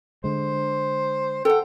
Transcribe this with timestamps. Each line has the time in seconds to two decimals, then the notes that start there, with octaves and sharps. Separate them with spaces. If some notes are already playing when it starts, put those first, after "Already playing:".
0.24 D3 G#3 C5
1.45 A4 F#5 G5